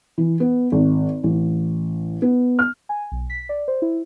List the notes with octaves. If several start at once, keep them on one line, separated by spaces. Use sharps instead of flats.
E3
B3
G#1
A1
B3
F6
G#5
B1
B6
D5
C5
E4